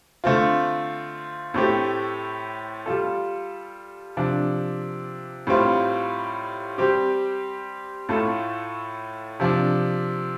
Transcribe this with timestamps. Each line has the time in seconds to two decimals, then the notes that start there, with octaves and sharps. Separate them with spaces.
0.24 D3 A3 C4 F4
1.54 A2 A3 C4 G4
2.86 G3 F4 A4
4.17 C3 F3 D4
5.47 A2 G3 C4 F4
6.78 G3 C4 G4
8.09 A2 A3 F4 A4
9.40 C3 F3 D4